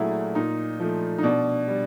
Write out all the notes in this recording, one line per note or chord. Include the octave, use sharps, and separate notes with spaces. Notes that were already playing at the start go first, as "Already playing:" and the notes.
Already playing: A#2 F#3 A3 E4 G#4
A#2 D#4
F3 A3
D#4
B2 D4
G3